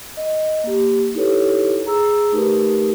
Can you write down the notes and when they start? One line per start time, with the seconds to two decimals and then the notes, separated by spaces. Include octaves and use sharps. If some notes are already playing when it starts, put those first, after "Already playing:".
0.17 D#5
0.64 A#3 G4
1.15 D#4 E4 G4 A4 B4 C#5
1.85 G#4 A#5 E6
2.32 A3 D#4 G4 A#4 B4